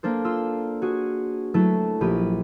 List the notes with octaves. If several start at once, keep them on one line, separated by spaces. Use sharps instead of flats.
A#3 D4 A4 C5
F4 C6 E6
F#4 G#4
F#3 A3 E4 A4
A#1 G4 B5 D#7